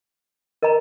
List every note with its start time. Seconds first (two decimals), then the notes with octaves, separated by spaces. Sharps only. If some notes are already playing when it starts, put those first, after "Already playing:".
0.62 A#4 D#5 A#5